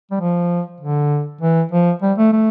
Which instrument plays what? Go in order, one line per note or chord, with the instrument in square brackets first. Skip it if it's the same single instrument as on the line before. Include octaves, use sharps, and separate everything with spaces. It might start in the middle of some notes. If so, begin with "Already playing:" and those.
[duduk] G3
F3
D3
E3
F3
G3
A3
A3